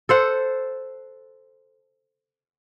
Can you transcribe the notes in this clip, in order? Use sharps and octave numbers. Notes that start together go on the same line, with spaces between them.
A4 C5 F#5